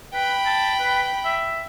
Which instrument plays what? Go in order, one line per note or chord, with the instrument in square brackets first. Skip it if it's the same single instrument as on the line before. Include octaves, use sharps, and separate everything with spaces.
[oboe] B4 [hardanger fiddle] G5 B5
[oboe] A5
B4
E5